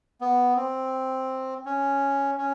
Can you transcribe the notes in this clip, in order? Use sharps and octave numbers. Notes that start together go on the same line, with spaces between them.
B3
C4
C#4
C#4